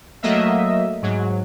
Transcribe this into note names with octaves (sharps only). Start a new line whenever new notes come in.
F#3 A3 A#3 D#5 E5
G#2 F#3